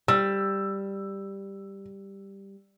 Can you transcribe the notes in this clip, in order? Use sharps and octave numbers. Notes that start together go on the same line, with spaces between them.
G3 E6